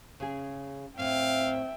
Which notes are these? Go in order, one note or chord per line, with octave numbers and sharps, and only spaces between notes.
C#3 G#4
A2 C4 E5 F5 G5